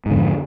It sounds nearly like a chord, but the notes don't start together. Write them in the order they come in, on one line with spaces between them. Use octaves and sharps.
G#2 D3 F2